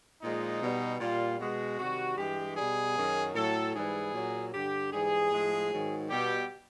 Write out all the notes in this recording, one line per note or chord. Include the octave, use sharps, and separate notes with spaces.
A#2 F3 G#3 D#4
B2 G3
A#2 G3 F4
B2 G#3 F#4
C3 D#3 G3 F#4
G2 E3 G#3 G4
B2 G3 G#4
F#2 D#3 F#3
A2 F#3 A4
G#2 E3 G3 G#4
A#2 F#3
G2 D3 G3 G4
G#2 E3 G3 G#4
A2 F3 G#3
G#2 D#3 F#3
B2 G3 G4